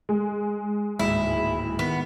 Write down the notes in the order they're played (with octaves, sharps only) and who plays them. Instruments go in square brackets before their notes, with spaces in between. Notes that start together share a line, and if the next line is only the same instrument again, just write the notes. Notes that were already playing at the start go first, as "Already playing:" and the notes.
[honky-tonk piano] G#3
[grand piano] D1 D#2 G#2 [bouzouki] E4
[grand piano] D#3 [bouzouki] B3